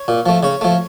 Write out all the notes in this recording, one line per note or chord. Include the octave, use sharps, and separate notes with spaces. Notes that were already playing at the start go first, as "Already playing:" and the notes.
Already playing: C#5
A#2
F3 A3
C#3 C#5
F3 A3